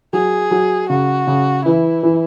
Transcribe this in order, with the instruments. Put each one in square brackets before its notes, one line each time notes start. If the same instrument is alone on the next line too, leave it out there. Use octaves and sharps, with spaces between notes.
[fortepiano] F#3 [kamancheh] G#4
[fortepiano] F#3
[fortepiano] C#3 [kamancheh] F#4
[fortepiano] C#3
[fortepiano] E3 [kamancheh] E4
[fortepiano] E3